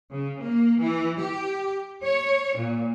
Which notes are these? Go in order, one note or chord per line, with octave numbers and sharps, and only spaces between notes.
C#3
A#3
E3
G4
C#5
A#2